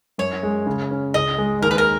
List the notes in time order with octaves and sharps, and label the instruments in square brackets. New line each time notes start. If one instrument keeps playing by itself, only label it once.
[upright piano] F#2 [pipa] C#5
[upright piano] G#3
C#3
C#4
[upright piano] C#2 [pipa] D#5
[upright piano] G#3
[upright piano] D#2 [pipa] A#4
[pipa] B4
A#4